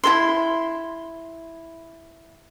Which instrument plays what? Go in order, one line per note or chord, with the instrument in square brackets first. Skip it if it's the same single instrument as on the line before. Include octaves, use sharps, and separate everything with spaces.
[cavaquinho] E4 A4 C6